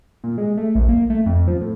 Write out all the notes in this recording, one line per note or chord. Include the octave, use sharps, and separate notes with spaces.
A#2
G#3
A3
A#1
A#3
A3
F2
F3
A2